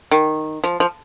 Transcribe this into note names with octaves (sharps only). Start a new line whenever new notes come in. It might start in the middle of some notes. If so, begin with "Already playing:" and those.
D#3
F3
F3